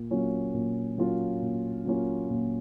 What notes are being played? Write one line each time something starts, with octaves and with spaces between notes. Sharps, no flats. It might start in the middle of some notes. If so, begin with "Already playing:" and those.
Already playing: A#2
F#3 A#3 C#4 F4
A#2
F#3 A#3 C#4 F4
A#2
F#3 A#3 C#4 F4
A#2